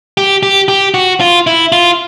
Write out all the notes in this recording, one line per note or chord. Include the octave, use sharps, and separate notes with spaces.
G4
G4
G4
F#4
F4
E4
F4